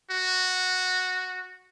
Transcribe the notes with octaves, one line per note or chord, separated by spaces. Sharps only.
F#4